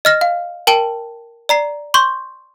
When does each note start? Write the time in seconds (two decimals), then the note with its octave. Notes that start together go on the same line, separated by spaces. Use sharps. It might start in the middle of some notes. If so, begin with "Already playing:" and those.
0.05 D#5 F6 A#6
0.21 F5
0.67 A#4 G5 A5 D7 G7
1.49 D5 A#5 C7
1.94 C6 C#6 G6